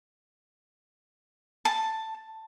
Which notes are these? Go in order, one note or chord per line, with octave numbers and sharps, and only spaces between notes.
A5